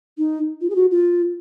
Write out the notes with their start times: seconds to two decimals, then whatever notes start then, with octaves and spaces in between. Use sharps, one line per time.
0.18 D#4
0.61 F4
0.70 G#4
0.75 F#4
0.91 F4